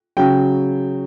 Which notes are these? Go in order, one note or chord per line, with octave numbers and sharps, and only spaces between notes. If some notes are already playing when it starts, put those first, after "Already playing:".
C#3 F#3 G5